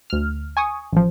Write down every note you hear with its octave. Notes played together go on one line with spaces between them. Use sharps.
D2 F6
G#5 C#6 D#6
A1 F3